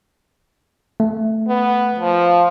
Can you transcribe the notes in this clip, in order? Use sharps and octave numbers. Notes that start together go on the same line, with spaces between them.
A3
B3
F3